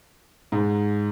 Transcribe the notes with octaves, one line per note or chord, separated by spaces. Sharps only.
G#2